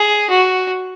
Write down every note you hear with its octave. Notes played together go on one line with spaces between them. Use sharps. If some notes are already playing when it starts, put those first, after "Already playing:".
Already playing: G#4
F#4